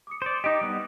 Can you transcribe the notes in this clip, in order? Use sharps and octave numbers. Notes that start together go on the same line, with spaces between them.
D6 D#6 C#7
C5 D5
D#4 G4 D#5 D#6
G3 B3